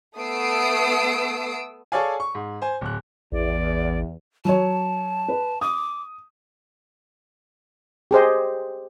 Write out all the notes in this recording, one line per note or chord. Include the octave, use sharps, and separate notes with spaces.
A3 B3 D#6 E6 C7 D7
G#4 A4 C#5 D5 F5 G#5
C#6
G#2
C5 G#5
D1 F#6
A1 E2 D5
F#3 C#5 A5
B4
D6 D#6
G4 G#4 C5 D#5